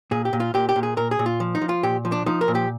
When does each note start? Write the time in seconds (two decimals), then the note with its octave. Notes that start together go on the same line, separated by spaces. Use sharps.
0.11 A#2 G#4
0.25 G4
0.33 A#2
0.40 F4
0.54 A#2 G4
0.69 G4
0.76 A#2
0.83 G#4
0.97 A#2 A#4
1.11 G#4
1.19 A#2
1.26 F4
1.40 F3
1.55 D#4
1.62 F3
1.69 F4
1.83 A#2 G4
2.05 F3
2.12 D4
2.26 F3 D#4
2.41 A#4
2.48 A#2
2.55 G4